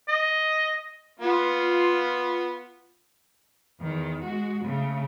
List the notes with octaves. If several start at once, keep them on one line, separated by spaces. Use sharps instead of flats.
D#5
B3 F4
E2 D#3
G#3 F#4
C#3 A3